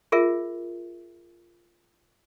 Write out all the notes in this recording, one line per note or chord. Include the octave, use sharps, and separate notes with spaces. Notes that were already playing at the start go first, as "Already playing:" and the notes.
F4 G#4 A#4 E5